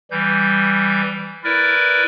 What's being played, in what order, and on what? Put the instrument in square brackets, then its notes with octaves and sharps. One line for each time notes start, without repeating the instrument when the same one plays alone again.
[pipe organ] E3 G3 G6
E4 A#4 B4 D5